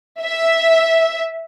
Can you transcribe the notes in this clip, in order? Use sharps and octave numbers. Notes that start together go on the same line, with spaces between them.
E5